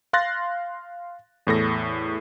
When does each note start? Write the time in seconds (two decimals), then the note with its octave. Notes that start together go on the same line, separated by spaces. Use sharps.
0.13 F5 C6 F#6 A6 A#6
1.47 E2 A2 A4 A#6